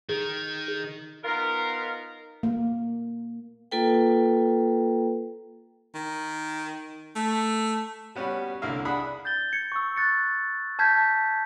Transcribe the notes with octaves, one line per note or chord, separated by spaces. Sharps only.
D#3 G#4
B3 D#4 F4 A#4
A#3
A#3 F4 A4 B4 G5
D#3
A3
G3 B3 C#4 F#4
C2 D3 A#3 E4 F5 E6
D4 G#4 F#5 B5 D#6
G6 A6 G7
G#6 C#7
C#6 E6
F#6 A6 C#7
A5 F6 G6 G#6 B6